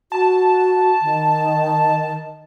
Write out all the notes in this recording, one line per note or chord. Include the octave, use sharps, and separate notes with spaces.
F#4 A5
D#3